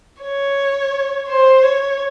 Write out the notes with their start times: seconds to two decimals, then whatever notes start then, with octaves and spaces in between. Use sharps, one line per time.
0.22 C#5
1.28 C5
1.63 C#5